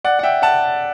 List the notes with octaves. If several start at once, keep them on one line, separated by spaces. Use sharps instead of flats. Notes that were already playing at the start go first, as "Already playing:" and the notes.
D5 F#5
F#5
E5 G5
F#5 A5